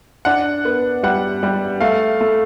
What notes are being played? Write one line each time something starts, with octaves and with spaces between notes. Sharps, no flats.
D4 F#5
B3
G3 F#5
G3
A3 F5
A3